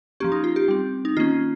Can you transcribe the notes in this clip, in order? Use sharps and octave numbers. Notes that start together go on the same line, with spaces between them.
F3 A#3 C#4 G4
D#4
F4
G4
G3 C4
D#4
D#3 A#3 C#4 F4